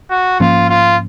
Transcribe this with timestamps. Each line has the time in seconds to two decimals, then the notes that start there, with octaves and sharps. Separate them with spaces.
0.10 F#4
0.40 G#2 F3 A#3 C#4 F4
0.70 F4